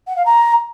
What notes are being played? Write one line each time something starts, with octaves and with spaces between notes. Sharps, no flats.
F#5
F5
A#5